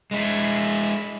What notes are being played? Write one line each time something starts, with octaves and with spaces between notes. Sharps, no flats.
G#3 E4